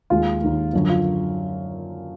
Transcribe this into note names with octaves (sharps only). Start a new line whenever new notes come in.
D#2 D#3 G#3 F4
D#2 D#3 G#3
F#2 D3 F3
F4